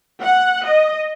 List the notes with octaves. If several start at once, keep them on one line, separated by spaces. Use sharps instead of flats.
F#5
D#5